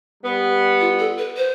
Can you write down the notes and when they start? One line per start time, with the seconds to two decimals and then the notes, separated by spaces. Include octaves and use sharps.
0.24 G3 B3
0.80 F4
0.99 A4
1.18 B4
1.37 C5